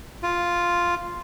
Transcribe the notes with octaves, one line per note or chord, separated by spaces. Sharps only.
F4